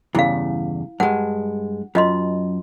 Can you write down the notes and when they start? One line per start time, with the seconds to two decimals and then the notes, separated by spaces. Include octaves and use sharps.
0.15 E2 G2 C#3 E4 F5
1.00 G2 G#3 F#5
1.95 F#2 F4 D#5 C6